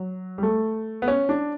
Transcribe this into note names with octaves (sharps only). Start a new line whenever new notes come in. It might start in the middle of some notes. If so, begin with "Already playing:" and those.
Already playing: F#3
G3
A3
B3
C#4
D4